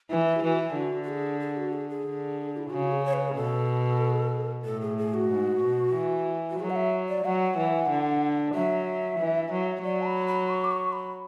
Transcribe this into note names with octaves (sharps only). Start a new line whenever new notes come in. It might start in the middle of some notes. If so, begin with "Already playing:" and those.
E3 E4
E4
G#4
E3 F#4
E4
D3 F#4
F#4
G#4
G#4
F#4
G#4
G#4
D3
E4
C#3 F#4
G#4
C#5
B4
G#4
B2 A4
A2 A4
G#4
G#4
F#4
G#2
B2
E3
F#4
F#3 G#4
F#5
E5
D5
F#3 F#5
E3
D3
F#3 E5
E3
F#3
F#3 D5
A5
B5
B5
C#6
D6
C#6
B5